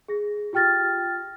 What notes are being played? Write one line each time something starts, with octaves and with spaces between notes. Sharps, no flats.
G#4 A#6
F4 G4 G5 F6 A6 A#6